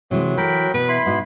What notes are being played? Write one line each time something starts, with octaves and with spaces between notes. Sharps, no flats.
C3 E3 F#3 G#3
E3 A4 A#4 G5 B5
B2 B4
E4 B5 C6
G#2 B2